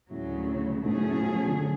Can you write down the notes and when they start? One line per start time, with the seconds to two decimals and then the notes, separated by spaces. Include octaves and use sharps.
0.11 D2 A2 C#3 F#3
0.84 G#2 B2 F#3 A3 C#4 G#4
0.97 A2
1.10 A2
1.22 F3
1.35 F3
1.47 D3
1.59 D3